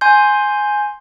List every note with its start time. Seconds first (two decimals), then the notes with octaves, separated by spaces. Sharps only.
0.01 G#5 C6 G6